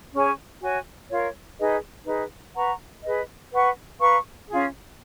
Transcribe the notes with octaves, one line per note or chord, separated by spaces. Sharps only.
C#4 G#4 C#5 G#5
F#4 C#5 G#5
F4 A#4 C#5
D#4 G#4 B4 D#5
D#4 G#4 B4
B4 F#5 A#5 C#6
G#4 B4 D#5
B4 F#5 C#6
B4 F5 A#5 C#6
C#4 F4 G#4